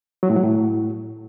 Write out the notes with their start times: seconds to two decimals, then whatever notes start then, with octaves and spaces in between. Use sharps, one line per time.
0.23 F#3
0.30 A2
0.37 F#3
0.43 A2